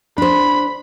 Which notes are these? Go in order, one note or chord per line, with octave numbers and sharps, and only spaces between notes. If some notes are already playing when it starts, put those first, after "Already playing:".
D4 C5 B5